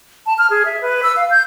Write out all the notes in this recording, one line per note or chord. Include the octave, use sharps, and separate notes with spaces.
A5
F6
G#4
E5
B4
E6
F5
G6